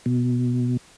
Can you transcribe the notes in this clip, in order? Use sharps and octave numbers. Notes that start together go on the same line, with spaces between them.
B2